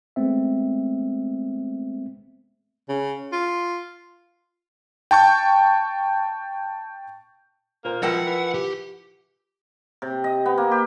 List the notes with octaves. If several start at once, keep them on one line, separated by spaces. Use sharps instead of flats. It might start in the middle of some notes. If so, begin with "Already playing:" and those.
G#3 A3 B3 C4 E5
C#3
F4
G5 A5 C#6 G6
A#2 A#3 C5 A#5
B2 F3 F4 A#4 E5 F#5 G5
E3
G4
C3
D#5
B3
A#3
G4